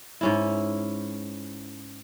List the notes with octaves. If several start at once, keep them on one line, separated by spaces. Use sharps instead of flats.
G#2 C#4 E4